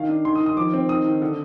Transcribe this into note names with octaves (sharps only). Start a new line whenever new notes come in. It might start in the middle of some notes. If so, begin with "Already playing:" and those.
Already playing: D#3 F5
D4
D#3 C6
D#6
D#3
D#6
F3 D6
C4
D#3 D#6
D#3
D3